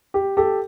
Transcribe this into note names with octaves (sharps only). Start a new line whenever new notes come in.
G4
G4 A4